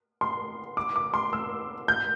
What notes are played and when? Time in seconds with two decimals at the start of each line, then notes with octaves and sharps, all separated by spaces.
0.21 C6
0.77 D6
0.96 D6
1.14 C6
1.33 E6
1.88 G6